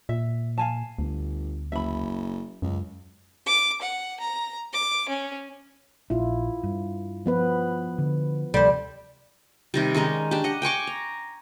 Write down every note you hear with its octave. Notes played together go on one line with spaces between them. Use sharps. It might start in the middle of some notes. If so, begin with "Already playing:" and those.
A#2 E5
F5 G#5 A5
G1 D2
F#1 E5 B5
C#2 F#2
D6
F#5
A#5
D6
C#4
A#1 E4 F4
G2
F3 B3 B4
D3
D2 C3 F3 G3 A4 C5
C3 D#3 G3
D#3 G#3 C#4 D#4
D4 G4
D#5 F#5
G5 G#5 C#6 D6
A#5